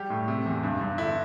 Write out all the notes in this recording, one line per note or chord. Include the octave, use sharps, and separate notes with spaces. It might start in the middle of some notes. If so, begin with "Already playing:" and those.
Already playing: G3 G4
A2
C3
E2
G2
G2
D3 E4